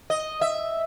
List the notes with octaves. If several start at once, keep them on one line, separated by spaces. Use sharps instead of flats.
D#5
E5